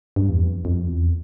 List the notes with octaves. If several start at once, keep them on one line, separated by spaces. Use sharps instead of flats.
G2
E2
F2
F2
E2